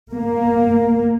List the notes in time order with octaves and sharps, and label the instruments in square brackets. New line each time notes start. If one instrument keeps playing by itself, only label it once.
[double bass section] A#3